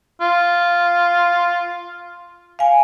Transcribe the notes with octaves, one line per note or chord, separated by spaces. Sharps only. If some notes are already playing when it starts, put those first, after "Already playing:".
F4
F5 G#5